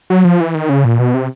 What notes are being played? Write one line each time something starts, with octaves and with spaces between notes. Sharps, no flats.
F#3
F3
E3
D#3
C#3
A#2
B2
C3